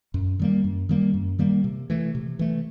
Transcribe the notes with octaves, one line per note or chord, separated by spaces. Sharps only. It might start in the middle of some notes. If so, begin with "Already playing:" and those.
F#2
D#3 G3 A#3
F#2
D#3 G3 A#3
F#2
D#3 G3 A#3
C3
E3 A3
C3
E3 A3